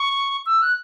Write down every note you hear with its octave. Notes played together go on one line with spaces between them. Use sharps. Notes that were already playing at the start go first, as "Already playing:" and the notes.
Already playing: C#6
E6
F#6